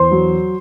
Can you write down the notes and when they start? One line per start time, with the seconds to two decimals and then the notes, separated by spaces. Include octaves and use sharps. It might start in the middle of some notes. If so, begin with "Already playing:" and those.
Already playing: E2 C5 C6
0.11 F#3